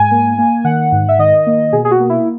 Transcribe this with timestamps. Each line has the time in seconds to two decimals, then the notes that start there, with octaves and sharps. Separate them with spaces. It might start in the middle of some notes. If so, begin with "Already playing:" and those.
Already playing: G#2 G#5
0.11 A#3
0.38 A#3
0.64 D#3 F#5
0.92 G#2
1.09 E5
1.19 D#3 D#5
1.46 A#3
1.73 B2 G#4
1.85 G#4
1.91 F#4
2.00 A#3
2.10 E4